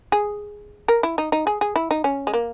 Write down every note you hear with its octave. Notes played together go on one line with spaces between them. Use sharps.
G#4
A#4
E4
D#4
D#4
G#4
G#4
E4
D#4
C#4
G#3
A#3